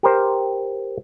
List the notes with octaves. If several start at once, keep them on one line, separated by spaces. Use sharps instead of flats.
G4 A#4 C5